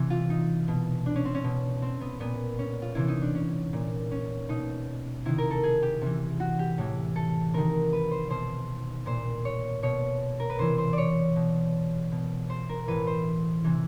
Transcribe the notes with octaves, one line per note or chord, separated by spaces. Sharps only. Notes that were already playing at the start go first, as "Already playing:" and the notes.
Already playing: C3 E3
F4
D#4
B2
D4
C#4
C4
C#4
B2
C4
B3
A#2 B3
C#4
F4
C3 E3 E4
D#4
D4
C#4
A#2
C#4
B2 D#4
C3 D#3 E4
A#4
A4
G#4
G4
C3 E3
F#4
G4
A2 E3
A4
C3 D#3 A#4
B4
C5
B2 C5
A#2 C5
C#5
B2 C#5
A#4
B4
C3 E3 C5
C5
C#5 D5
B2
B2
C5
A#4
A2 E3 B4
C5
C3 E3